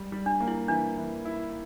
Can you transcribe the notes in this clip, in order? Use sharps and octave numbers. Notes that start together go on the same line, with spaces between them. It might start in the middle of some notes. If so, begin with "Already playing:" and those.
Already playing: G3
G3
D4
A#3
E4
E3 D4
E3
E4